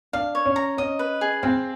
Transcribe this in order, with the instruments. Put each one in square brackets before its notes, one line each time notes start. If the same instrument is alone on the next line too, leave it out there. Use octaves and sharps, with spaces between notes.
[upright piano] D4 [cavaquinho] F5
[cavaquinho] C#5
[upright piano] C#4
[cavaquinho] A#5
[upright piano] C#4 [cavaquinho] D#5
[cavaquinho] B4
G#4
[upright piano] C4 [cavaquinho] F5